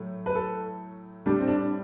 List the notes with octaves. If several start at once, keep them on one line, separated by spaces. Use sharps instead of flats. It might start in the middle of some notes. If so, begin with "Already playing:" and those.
Already playing: A2 F#3 A3
B4
A4
A2 G3 D4
C4
D4